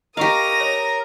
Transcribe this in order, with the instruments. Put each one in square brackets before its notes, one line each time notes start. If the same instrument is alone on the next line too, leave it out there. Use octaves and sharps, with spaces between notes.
[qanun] G4 F5 [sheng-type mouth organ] A#4 A#5 [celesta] D#5 C#6 [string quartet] D#6 A#6
[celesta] C#5